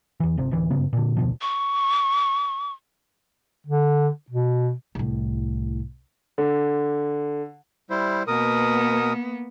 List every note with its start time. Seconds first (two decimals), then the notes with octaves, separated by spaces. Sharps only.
0.20 E2 E3
0.37 G1 C3
0.51 D1 D2 E3
0.70 F#1 G2 C#3 B3
0.93 A#2 D3
1.17 F1 D2 B2 F3
1.41 C#6
3.67 D3
4.31 B2
4.95 C2 A2
6.38 D3
7.90 G3 E4 C5
8.27 B2 A#3 B3 A#4 D#6